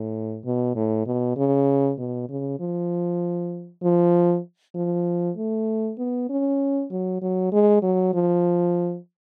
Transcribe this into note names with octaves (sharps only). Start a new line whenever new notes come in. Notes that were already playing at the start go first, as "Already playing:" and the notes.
Already playing: A2
B2
A2
B2
C#3
B2
C#3
F3
F3
F3
A3
B3
C#4
F#3
F#3
G#3
F#3
F3